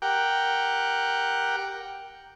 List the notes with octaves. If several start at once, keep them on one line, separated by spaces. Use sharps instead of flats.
G4 A#4 F#5 G5